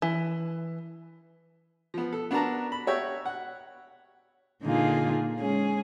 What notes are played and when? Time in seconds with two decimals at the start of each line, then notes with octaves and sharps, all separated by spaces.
0.02 E3
1.94 F3 B3
2.13 A4
2.31 B3 D4 F#4 A#4 A5 A#5
2.72 B5
2.87 F#4 C#5 E5 G5
3.25 F#5
4.63 A#2 D3 A#3 D#4 F4 G#4
5.39 G#3 C#4 G#4